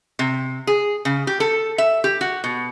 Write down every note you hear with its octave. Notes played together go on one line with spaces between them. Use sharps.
C3
G#4
C#3
G4
A4
E5
G4
F#4
B2